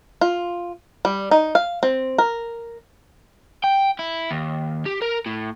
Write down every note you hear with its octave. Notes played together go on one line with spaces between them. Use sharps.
F4
G3
D#4
F5
C4
A#4
G5
E4
D#2
G4
A#4
A2